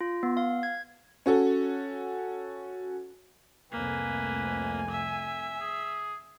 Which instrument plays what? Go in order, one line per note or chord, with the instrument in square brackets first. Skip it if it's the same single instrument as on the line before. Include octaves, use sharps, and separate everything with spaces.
[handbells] F4
B3
F5
G#6
[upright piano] C#4 F#4 A4
[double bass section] C2 F2 A3 [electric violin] A#3 [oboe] B4 [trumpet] G#5
[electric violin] E5
[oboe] G#4